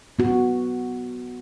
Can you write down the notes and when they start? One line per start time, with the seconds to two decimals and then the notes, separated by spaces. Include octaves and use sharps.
0.19 B3 F#4